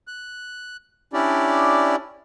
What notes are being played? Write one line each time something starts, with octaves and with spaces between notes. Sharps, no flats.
F#6
C#4 D4 E4 G4 D5